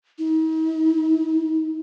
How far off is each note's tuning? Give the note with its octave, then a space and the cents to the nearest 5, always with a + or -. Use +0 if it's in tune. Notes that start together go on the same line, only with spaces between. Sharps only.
D#4 +45